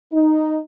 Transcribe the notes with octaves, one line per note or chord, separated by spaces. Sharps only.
D#4